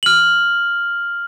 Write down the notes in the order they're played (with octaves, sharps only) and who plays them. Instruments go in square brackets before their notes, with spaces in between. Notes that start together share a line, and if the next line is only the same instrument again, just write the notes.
[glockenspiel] F6 F#7